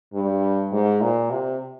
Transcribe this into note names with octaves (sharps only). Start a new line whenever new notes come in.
G2
G#2
A#2
C3